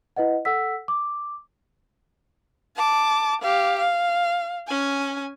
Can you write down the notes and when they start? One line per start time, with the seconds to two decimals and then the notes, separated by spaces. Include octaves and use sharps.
0.16 E4 B4 D#5 F#5
0.45 A4 F#5 E6 B6
0.88 D6
2.76 A5 D6
3.41 G4 F5
3.79 F5
4.68 C#4 G#5